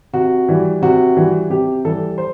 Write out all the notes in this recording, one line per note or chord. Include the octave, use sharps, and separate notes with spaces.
C3 F#4
E3 G3
C3 F#4
E3 G3
C3 G4
E3 G3 A4
C5